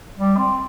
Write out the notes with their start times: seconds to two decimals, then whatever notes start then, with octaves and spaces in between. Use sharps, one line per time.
0.18 G3
0.37 C4